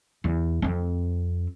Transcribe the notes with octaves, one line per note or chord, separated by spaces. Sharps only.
E2
F2 C4